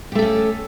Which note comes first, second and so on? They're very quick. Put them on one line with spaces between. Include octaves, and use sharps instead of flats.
G4 A3 A4 C#4